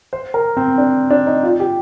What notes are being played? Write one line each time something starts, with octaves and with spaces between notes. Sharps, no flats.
C5
A#4
C4
D4
D4
D#4
F4
G4